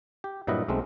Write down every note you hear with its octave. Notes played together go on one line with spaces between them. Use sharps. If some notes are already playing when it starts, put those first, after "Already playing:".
G4
G2 A#2 F#3 E4 B4 D#5
B1 G#3 A3 C4